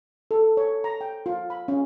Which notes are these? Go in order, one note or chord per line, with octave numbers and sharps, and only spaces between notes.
A4
C#5
A#5
G5
F4
B5
C#4